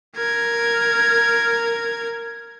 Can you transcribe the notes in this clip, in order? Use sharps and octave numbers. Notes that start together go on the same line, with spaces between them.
A#4 G#6